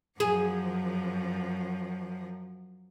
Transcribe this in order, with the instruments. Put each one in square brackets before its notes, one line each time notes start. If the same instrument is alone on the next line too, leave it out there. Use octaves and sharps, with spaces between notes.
[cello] F#2 F3 [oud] G#4